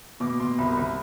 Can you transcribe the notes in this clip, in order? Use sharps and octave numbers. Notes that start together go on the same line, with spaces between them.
B2 D6
B2 C6
C2 B5
C2